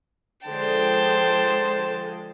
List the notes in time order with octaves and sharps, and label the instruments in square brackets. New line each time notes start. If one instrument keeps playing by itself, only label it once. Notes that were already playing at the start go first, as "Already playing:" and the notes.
[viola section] D3 F3 G#3 [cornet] C5 [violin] G5 A5